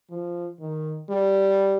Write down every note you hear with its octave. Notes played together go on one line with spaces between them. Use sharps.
F3
D#3
G3